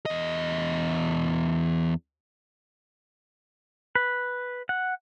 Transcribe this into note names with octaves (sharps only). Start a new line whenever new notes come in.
E2 D#5
B4
F#5